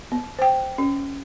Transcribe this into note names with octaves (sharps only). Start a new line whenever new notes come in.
B3
C5 G5
C#4